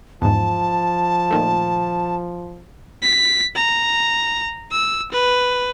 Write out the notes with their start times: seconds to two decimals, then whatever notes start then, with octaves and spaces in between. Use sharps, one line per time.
0.22 E2 G#2 F3 A5
1.31 A#2 D#3 A3
3.02 B6
3.56 A#5
4.72 E6
5.12 B4